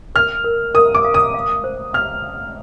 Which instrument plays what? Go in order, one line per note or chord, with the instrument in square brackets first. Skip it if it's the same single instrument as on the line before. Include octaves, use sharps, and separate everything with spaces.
[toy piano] A#4 [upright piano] F6
[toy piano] A#4
[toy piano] A#4 [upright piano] D#6
[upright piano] D6
[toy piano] F5
[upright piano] D#6
[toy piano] F5
C5
[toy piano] F5 [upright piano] F6
[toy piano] F5